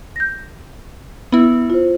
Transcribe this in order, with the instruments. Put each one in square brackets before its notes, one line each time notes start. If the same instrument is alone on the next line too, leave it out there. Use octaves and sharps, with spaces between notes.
[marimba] G6 A#6
[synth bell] B3 E4
[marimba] F4 C5